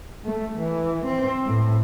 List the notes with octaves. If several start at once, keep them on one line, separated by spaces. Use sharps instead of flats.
A3
E3
C4
A2